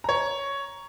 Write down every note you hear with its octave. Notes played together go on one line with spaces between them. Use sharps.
C#5 A#5